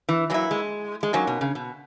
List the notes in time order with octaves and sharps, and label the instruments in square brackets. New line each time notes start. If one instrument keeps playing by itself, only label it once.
[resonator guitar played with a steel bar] E3
[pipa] E3 A#3 E4 [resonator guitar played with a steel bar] F#3
[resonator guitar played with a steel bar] G#3
G#3
[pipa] D#3 A#3 C#4 [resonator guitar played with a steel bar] F#3
[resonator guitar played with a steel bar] B2
C#3
B2